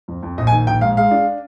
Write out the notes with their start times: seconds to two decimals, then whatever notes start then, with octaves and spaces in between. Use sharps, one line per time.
0.08 F2
0.23 F2
0.38 A#1 D#5
0.47 G#5
0.52 D#3
0.67 A#1 G5
0.81 G#2 F5
0.97 G#3 F5
1.11 D4